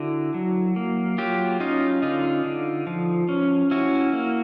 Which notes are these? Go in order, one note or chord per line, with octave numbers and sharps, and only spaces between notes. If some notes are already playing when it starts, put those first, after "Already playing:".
Already playing: D3 E4 F#4
F#3
A#3
F#3 F4 G4
C#4 D#4 F4
D3 D#4 F4
D3
F3
C#4
C#4 E4 F#4
A#3